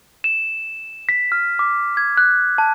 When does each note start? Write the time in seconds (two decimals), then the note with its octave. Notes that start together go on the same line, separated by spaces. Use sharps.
0.24 E7
1.09 B6
1.32 F6
1.59 D6
1.97 G#6
2.17 F#6
2.58 A5